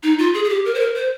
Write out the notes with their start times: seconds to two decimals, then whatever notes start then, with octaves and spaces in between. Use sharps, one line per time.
0.03 D#4
0.19 F4
0.34 G#4
0.44 G#4
0.49 G4
0.65 A#4
0.74 C5
0.80 A#4
0.95 C5